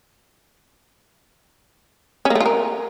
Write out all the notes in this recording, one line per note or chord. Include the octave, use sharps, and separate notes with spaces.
C#4
A#3
A3
F4
A#4